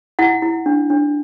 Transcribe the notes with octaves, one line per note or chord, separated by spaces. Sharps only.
E4 F#5
E4
D4
D4